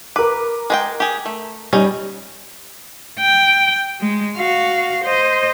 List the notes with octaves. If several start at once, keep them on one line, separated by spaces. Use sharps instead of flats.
A#4 B4 D6
G#3 B4 G5
G4 G#4
A3
G3 C#4 D#4
G5
G#3
F#4 F5
C5 D#5